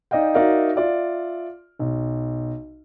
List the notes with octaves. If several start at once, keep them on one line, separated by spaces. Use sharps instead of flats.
D#4 D5 D#5 F5 G5
D#4 F#4 A#4 D5 E5 F5
F4 D5 E5
B1